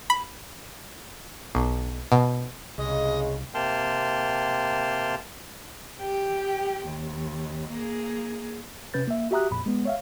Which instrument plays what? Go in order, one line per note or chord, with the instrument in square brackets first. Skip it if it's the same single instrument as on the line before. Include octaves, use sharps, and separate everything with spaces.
[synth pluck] B5
B1
B2
[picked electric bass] C2 [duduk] C#3 [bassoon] G#3 [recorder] D#5
[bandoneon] C3 A#3 G5 A5 C6 F6
[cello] G4 G5
D#2
A#3 G#4
[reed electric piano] C3 C#4 B4 G6 A6
A#3 E5
F#4 G4 E5 A#5 D#6 F#6
F2 A#2 B5
G#3 B3
C#5 E5 F5